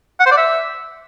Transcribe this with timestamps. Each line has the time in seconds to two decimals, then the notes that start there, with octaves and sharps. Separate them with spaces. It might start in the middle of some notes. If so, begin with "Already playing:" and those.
0.20 F#5
0.26 C5
0.31 D5
0.37 E5